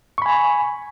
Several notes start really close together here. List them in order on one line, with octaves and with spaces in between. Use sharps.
C#6 B5 G#5